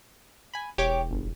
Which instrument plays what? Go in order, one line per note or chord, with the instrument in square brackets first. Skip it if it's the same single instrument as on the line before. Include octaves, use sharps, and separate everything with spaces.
[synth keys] G#5 B5
[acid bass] E1 [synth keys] G4 C#5 D6
[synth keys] G1